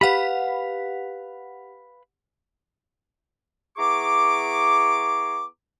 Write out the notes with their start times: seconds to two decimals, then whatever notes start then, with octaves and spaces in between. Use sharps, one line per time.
0.01 G4 B4 F5 F#5 B5
3.77 B3 E4 G#4 A#5 C#6 D6